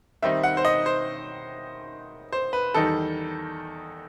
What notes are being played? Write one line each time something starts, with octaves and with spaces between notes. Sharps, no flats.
D#3 G3 C4 D#4 E5
F#5
C5
D#5
C5
C5
B4
E2 D#3 G3 D#4 A4